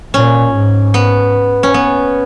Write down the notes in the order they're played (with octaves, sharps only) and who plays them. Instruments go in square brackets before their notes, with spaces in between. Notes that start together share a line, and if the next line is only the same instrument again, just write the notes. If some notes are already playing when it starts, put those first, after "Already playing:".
[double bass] A#2 [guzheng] C#4
[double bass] G#2
[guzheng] B3
C#4
B3